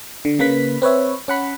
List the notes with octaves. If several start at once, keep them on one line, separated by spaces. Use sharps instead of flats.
D3
C#3 A#3 B4 B5 B6
C4 B4 C#5 E5
C#4 F#5 B5